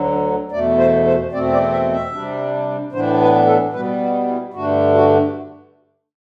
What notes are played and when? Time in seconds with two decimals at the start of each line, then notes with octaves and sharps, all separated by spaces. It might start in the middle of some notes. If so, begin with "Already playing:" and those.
Already playing: D2 D3 F#3
0.51 E2 B2 A3 D5
0.78 C5
1.05 C5
1.32 E2 B2 A3 C4 D5
1.52 D5
1.72 E5
1.92 E5
2.12 C3 G3 D4
2.92 A2 E3 B3 D4 C5
3.20 B4
3.46 A4
3.73 B2 G3 B3 B4
4.00 F#4
4.27 E4
4.54 G2 D3 A3 D4 F#4
4.94 F#4